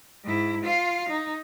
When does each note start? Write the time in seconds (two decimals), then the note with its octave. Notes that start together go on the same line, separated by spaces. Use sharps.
0.24 G#2 E4
0.64 F4 F5
1.09 D#4